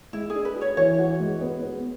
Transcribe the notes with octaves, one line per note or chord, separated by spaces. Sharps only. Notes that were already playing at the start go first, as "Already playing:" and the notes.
G#3 E4
G#4
D4
B4
F#4
C#5
E3 C#5
F#4
G#3
B3
B3